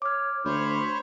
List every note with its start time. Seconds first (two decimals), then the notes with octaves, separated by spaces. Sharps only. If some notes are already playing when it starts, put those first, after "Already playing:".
0.02 C#5 D6 F6
0.45 D2 C5 C#5 B5